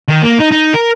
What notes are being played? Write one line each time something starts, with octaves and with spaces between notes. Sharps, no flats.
D#3
A#3
D#4
D#4
A#4